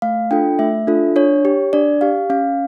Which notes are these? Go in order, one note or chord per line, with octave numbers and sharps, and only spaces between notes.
A3 F5
D4 F4 A4 G5
A3 E5
D4 F4 A4
D4 C#5
G4
D4 D5
G4 F5
C#4 F5